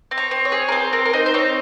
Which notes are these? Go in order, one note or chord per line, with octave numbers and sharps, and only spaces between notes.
C4
C#5
C4
C#5
G#4
A#4
C4 C5
C4 A#4
A#4
D#4 C5
C5
C4 C#5